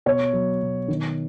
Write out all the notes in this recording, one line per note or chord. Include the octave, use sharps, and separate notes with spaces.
B2 C#5
F#3
B2
D#3